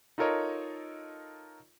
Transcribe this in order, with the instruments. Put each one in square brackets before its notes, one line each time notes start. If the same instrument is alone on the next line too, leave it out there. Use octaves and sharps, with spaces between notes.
[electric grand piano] D#4 F4 A4 A#4 C#5 D#5